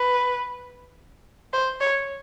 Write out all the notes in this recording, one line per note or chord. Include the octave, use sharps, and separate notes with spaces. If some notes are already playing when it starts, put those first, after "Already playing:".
Already playing: B4
C5
C#5